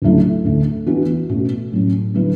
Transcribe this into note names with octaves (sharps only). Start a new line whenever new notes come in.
D2 C#3 F#3 A3 E4
D2 D3 A3
E3 B3 D4 F#4
B2 A3 C#4 F#4
A2 F#3 C#4
D3 F#3 B3 E4 B4